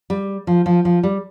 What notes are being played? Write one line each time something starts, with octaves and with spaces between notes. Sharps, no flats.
G3
F3
F3
F3
G3